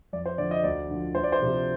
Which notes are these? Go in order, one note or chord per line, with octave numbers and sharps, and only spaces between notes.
F2 D5
C5
D3 F3 D5
D#5
D2 D5
D3 F3
D2 C5
D5
C5
C3 F3